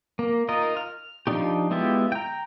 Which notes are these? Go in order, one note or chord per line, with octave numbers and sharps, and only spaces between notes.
A#3
D#4 F4 A#4 D#5
F6
F3 G3 D4 D#4 G4
G#3 B3 E4 F4 G4
G5 A#5